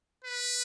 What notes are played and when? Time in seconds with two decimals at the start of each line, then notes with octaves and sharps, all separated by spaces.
0.24 B4